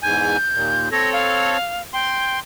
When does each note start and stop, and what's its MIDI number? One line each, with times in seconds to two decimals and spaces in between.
0.03 0.37 40
0.03 0.37 44
0.03 0.37 80
0.03 0.91 91
0.54 0.89 39
0.54 0.89 46
0.92 1.57 60
0.92 1.57 69
0.92 1.57 73
0.92 1.12 94
1.13 1.82 77
1.93 2.38 79
1.93 2.40 84